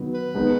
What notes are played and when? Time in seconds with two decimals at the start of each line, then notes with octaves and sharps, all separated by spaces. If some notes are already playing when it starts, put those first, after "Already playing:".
Already playing: D#3 F#3 B3
0.14 B4
0.35 D#3 G#3 B3 D#4